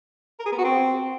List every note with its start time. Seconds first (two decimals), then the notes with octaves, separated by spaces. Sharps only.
0.40 A#4
0.46 G#4
0.52 B3
0.58 F#4
0.64 C4